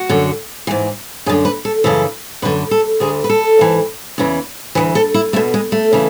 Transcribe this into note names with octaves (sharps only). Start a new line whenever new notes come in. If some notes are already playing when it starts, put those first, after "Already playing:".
Already playing: F#4
F#2 D3
G#2 E3
F#2 D3 G#4
B4
A4
F#2 C#3 E3 A4
F#2 D3 B4
A4
D2 D3 G#4
B4
A4
G#2 E3
E2 C#3 E3
D2 C#3 E3 B4
A4
E4
E2 B2 A3
G#3
A3
C#3 E3